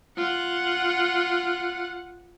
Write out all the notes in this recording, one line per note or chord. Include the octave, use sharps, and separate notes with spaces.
F4 F#5